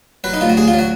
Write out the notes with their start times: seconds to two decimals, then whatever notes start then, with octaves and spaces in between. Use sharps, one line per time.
0.24 F#3 B4
0.34 D#4
0.41 D2 F4
0.49 F#4
0.57 D2 G#4
0.68 F4
0.73 F#3
0.79 F#4